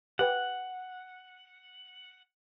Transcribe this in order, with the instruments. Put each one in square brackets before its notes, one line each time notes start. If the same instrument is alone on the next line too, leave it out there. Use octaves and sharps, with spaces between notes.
[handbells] G4 B4 G5 [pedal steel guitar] F#5